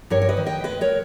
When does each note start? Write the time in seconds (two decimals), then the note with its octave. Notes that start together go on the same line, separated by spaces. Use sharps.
0.10 G2 A#4 C#5
0.22 C#5
0.29 B4 D#5
0.37 D#3
0.46 D#5 G5
0.64 G#3 B4 D#5
0.81 A#4 C#5